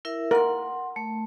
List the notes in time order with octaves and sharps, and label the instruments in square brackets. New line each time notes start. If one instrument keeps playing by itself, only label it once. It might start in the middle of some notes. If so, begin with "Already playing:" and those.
[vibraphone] E4 A#4 E5
[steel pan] A#4 [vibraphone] F#5 C6
[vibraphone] A3